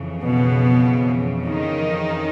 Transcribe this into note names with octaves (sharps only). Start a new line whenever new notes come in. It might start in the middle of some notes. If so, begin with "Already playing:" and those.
Already playing: F2 C#3 E3
B2 B3
D#3 D#4